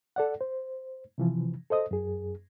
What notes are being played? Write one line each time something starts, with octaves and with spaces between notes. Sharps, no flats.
A4 D5 F#5
C5
C3 E3 F3
A4 C5 D#5 D#6
F#2 G#4